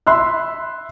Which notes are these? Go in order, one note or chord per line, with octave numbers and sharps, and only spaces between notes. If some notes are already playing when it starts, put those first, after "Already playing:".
E5 B5 C6 E6 F#6